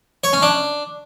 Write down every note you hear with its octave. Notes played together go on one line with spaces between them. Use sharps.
C#5
C#4
D4